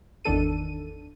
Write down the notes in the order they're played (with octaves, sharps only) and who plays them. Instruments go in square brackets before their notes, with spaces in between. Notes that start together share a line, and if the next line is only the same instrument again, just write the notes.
[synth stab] G#1 E2 D#3 D4 A4 D#7